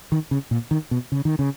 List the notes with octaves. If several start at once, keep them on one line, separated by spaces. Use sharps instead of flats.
D#3
C#3
A#2
D#3
B2
C#3
D#3
C#3